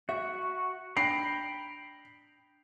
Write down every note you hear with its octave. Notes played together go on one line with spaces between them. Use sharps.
F#4 E5
D4 G5 A#5 B5 C7